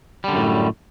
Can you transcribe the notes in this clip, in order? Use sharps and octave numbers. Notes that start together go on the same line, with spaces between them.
F#2 A2 D3 G3